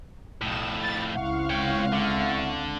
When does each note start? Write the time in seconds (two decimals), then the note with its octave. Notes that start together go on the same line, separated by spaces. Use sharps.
0.41 B1 F2 A2 D#6 E7
0.81 B5 A6
1.13 C#2 C4 E4 F5 F#5 C#6
1.50 C#5 G5
1.92 D3